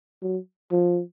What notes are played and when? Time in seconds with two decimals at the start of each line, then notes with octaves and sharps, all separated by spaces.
0.23 F#3
0.72 F3